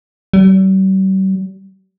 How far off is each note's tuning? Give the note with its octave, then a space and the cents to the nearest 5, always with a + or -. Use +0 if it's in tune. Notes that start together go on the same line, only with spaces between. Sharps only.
G3 -45